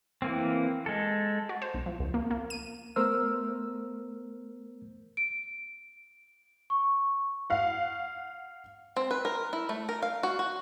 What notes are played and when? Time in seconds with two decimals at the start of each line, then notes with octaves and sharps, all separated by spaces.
0.22 E3 A#3 C4
0.86 G#3 A4
1.49 F#4
1.62 C5
1.74 B1
1.86 F3
2.00 C#2
2.14 A#3
2.31 A#3
2.50 D#7
2.96 A3 B3 A#4 C5 E6 F6
5.17 D7
6.70 C#6
7.50 F5 F#5
8.96 C4
9.11 B4
9.25 A#4
9.53 E4
9.69 A3
9.89 A#4
10.02 F5
10.23 F#4
10.39 F#4